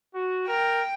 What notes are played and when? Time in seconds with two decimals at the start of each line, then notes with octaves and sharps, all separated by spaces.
0.14 F#4
0.48 A#4 G5